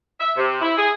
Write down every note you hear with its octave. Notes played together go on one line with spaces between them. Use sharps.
E5
C3
E4
G#4